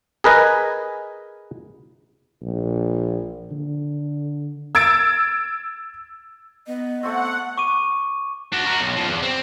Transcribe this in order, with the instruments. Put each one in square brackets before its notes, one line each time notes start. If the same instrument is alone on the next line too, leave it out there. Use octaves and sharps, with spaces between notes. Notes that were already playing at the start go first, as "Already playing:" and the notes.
[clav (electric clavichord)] G#4 A#4 B4 D#5 G#5
[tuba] A#1
D3
[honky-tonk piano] E6 G#6 A6 D7
[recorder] B3 [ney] D#5
[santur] A3 C4 [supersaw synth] F#5 [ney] C#6
[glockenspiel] C#6 D6 D#7
[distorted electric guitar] D4 F#4
F#4 A#4
B1
F#2 F3
E2
C4